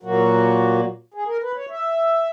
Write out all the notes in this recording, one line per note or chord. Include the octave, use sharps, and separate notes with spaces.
A#2 F#3 A#3 F#4
G#4
A#4
B4
C#5
E5